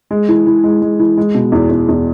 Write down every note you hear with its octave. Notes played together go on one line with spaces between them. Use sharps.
G#3
E3
E3
G#3
G#3
E3
G#3
B2
E2
E2
E2